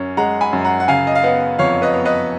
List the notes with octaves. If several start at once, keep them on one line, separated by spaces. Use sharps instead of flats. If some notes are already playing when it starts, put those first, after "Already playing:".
Already playing: F#2 C#4
G#3 F#5 A#5
G#5 B5
F#2
F#5 A#5
F#5
C#3 F5 G#5
D#5
F5
B3 D#5 F#5
F2 C#5 F5
B4 D#5
B3
B4 D#5